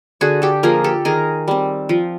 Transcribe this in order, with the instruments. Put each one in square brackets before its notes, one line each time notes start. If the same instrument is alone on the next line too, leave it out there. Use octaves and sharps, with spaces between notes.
[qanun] D3 F#4 G#4
G4 A4
F3 A#3 G#4 A#4
G4 A4
D#3 G#4 A#4
G3 C4
F3